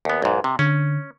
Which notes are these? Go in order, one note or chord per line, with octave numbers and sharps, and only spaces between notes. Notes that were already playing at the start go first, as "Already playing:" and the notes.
D#2 B3
B1 G#2
C3
D3 C#4